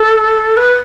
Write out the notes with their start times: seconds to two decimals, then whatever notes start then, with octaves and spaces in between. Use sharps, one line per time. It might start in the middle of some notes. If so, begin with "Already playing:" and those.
Already playing: A4
0.57 B4